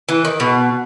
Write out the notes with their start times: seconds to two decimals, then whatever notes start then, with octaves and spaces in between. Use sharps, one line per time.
0.09 E3
0.25 D#3
0.40 B2